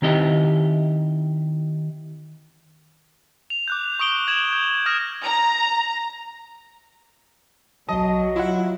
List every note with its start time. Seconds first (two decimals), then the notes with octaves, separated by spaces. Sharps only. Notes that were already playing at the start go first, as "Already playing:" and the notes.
0.02 D#3 C4 E4 G4 D#5
3.50 F7
3.68 D6 F#6 G6
3.99 C#6 D#6 D7 G7
4.27 F#6 G#6 E7 F#7
4.53 G6
4.86 D#6 F6 G#6 A#6 E7
5.23 A#5
7.89 B1 F#3 D#5 A5
8.36 E4 F4 F#5